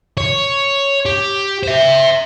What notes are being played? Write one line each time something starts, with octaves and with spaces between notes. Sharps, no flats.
C#5
G4
C5 E5